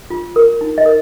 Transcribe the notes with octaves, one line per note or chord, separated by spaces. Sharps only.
F4
A#4
D#4
D#5
A#4